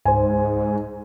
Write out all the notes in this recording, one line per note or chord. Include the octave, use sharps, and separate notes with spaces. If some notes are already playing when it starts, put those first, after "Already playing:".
C#2 G#2 C5 G#5